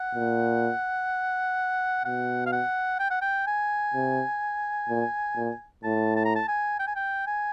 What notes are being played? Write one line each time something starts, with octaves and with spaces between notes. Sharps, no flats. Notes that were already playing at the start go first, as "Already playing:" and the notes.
Already playing: F#5
A#2
B2 F#5
F5
F#5
G5
F#5
G5
G#5
C3
A#2
A#2
A2 A5
A5
A#5
A5
G#5
G5
G#5
G5
G#5